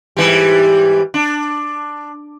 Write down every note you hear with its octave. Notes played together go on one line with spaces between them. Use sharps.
G#2 E3 G3
D4